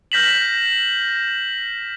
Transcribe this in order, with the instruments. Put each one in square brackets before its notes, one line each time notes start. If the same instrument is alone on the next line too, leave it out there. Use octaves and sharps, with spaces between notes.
[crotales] F6 G6 A#6 B6 E7 F#7